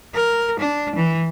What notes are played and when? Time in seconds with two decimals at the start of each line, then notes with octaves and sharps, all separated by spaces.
0.15 A#4
0.60 D4
0.96 E3